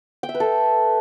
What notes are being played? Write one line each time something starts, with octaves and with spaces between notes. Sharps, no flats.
G5
E5
B4
A4